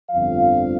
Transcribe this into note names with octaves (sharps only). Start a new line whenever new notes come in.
G1 F2 D3 F3 F5